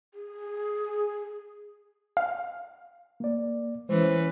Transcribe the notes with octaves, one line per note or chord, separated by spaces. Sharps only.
G#4
F5
A#3 D5
E3 G#3 C#4 B4 C5